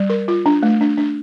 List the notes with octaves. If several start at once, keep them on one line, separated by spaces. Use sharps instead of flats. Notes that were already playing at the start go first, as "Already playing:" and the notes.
Already playing: G3
A#4
F4
D4
A3
D4
D4